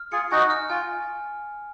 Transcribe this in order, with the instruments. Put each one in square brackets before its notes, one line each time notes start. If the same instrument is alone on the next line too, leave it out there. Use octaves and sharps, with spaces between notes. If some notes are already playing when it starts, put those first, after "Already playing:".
Already playing: [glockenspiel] F6
[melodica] F4 G#4 [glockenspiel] C#7
[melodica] D#4 F#4 [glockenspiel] G#5
[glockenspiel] F6
[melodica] F4 [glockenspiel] G#5